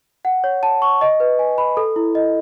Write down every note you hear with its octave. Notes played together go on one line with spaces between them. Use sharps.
F#5
C#5
A5
C#6
D#5
B4
G#5
B5
A4
E4
D#5